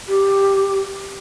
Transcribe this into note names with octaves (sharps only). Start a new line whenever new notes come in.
G4